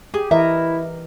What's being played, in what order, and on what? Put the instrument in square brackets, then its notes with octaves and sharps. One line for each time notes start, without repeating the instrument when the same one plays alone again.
[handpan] G4 [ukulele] G#4
[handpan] E3 A#4 D#5 [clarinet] E4 [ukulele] E5